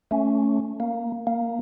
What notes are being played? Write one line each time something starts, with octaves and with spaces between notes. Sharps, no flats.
A3 C#4
A#3
A#3